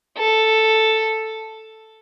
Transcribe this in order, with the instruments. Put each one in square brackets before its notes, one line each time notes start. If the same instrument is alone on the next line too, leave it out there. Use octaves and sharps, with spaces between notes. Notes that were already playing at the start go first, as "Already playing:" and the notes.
[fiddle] A4